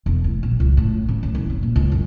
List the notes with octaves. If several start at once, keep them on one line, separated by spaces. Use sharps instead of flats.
E1
D2
A#1
C#2
A2
C#3
D2
F#1
C#3
A#2
C#2
F#2